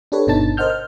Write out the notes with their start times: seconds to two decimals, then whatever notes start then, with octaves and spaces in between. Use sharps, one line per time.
0.12 D4 G4 A4 B4 C#5
0.27 G1 B2 D4 D#4 A5 A6
0.57 A#4 C5 D#5 F#5 F6 G6
0.70 F6